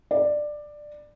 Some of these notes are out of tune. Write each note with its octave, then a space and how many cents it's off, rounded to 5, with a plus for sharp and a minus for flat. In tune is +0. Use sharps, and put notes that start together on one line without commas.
D5 +15